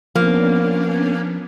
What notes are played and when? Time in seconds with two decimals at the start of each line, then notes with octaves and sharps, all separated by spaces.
0.16 F3 A#3 B3 C#4 D4